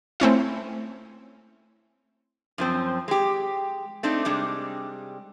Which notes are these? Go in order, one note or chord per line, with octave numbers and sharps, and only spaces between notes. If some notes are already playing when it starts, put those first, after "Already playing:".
A3 C4 C#4 E4
F#2 F3 C4
G#3 G4
A3 C4 D4 D#4
C3 G3 G#3 D4